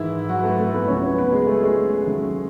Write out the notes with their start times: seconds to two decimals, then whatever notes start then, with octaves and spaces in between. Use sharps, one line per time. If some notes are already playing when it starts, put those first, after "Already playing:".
Already playing: G#2 D#3 E3 G#3 E4
0.29 F#3 F#4
0.39 B4
0.44 A3 A4
0.59 A3 A4
0.73 B3 B4
0.88 C#2 C#3 F#3 C#4 C#5
1.03 B3 B4
1.18 B3 B4
1.32 G#3 G#4
1.47 A3 A4
1.62 G#3 G#4
2.06 D#2 C#3 F#3 A3